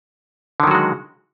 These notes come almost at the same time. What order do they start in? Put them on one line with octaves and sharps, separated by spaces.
D3 D#3 F#3 F#4 G#3